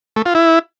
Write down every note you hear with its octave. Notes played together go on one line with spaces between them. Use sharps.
A3
F4
E4